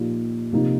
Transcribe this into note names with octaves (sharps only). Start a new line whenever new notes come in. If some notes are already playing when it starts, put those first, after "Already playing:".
Already playing: A#2 F3 A#3 D#4 G4
C3 F3 A#3 D#4